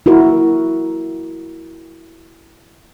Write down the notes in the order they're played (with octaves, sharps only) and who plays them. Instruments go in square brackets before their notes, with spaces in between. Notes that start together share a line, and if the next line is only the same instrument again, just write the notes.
[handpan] E4 F#4 A#4